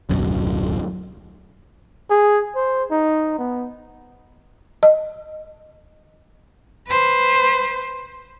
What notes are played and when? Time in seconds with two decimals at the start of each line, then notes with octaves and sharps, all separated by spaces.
0.09 D1 B1 F#2 B2
2.10 G#4
2.56 C5
2.91 D#4
3.38 B3
4.83 D#5
6.88 B4 C5